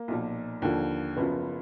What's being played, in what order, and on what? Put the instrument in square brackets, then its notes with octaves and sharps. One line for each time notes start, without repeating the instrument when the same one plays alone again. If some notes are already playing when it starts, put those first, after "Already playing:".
Already playing: [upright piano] A#3
B1 A#2 F3
D#2 D3 F3
F#1 F#2 F3 B3